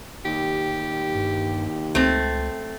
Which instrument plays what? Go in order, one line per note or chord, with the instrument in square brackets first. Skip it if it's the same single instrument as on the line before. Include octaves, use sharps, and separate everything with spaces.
[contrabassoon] D#2 [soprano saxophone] G4
[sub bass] G2
[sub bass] C#2 [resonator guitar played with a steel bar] A3 C4